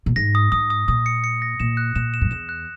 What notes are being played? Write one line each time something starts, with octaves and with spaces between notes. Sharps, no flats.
A#2
G#2 A#6
D#6
G#2 D#6
D#6
A#2 D#6
C#7
C#7
A#6
A#2 E7
F#6
A#2 E7
E7
F#2
E2 E7
F#6